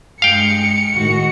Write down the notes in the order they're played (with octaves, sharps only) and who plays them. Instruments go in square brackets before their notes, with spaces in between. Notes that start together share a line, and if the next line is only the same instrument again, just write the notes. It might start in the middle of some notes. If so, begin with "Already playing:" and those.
[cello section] G2 G#3 [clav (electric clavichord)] F5 G5 [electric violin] C#7
[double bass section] A2 D#3 G#3 [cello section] F#4